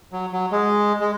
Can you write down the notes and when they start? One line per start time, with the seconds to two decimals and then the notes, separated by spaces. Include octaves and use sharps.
0.12 F#3
0.32 F#3
0.52 G#3
1.00 G#3